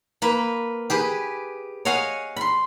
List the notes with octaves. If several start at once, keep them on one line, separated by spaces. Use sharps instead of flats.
A#3 B4
G4 G#4 B4
C#5 D#5 F5 F#5 G#5
B5 C6